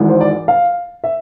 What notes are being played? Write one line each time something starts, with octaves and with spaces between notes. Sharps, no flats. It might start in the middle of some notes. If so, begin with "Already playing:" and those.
Already playing: G#1 G#2 E3
C5
D5
F5
E5